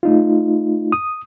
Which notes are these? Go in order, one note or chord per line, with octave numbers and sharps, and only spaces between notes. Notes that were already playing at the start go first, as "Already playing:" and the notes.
A3 D#4 F4
D#6